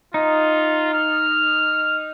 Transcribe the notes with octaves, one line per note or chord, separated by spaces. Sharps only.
D#4 F4
F6